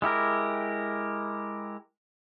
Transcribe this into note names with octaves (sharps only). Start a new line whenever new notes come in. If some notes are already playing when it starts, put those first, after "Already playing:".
G#3 E4 G4 A#4